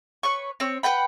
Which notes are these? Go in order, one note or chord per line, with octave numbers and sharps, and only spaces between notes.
B4 C#5 C#6
C4 C#5
B4 F#5 G5 B5